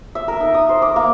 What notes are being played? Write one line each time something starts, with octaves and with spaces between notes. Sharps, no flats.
E5
A#4
D#4
D#6
C5
D6
A#3